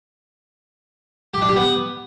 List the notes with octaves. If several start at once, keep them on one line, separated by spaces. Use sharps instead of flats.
G4
D4
G4
B3